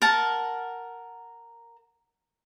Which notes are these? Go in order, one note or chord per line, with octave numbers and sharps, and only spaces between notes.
A#4 F#5 A5